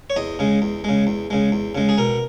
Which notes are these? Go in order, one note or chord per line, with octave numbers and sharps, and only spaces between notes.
C#5
E2 D#5
C#3 G#3
E2
C#3 G#3
E2
C#3 G#3
E2
C#3 G#3
G#4
B2 A#4